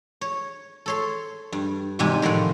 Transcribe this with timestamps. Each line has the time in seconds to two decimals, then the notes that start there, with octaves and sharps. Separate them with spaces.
0.21 C#5
0.86 A4 C#5 C6
1.52 G2
1.99 E2 G#2 C3 G#3 G4 G#5
2.22 A2 D#3 F3 C4 F#5